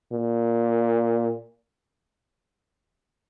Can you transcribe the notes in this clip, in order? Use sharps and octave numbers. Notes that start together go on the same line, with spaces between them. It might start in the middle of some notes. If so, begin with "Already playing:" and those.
A#2